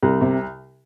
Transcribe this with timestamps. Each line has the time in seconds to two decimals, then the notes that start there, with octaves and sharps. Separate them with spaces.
0.03 C2
0.21 C3